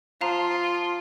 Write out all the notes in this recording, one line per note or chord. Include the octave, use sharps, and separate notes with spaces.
F3 F4 F5 A#5